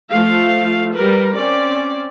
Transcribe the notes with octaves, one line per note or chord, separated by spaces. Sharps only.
F3 A3 F5
G3 A#4 B4
C4 C#4 D5